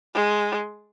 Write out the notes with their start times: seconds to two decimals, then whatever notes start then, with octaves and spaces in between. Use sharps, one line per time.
0.14 G#3